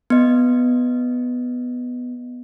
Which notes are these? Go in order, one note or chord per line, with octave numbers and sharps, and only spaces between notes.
B3 D#5